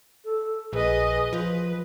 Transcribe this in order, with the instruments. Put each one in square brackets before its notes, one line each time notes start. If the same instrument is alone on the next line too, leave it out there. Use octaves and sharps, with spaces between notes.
[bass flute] A4
[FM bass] A#1 [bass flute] G#4 [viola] B4 D#5
[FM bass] F3 [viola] B4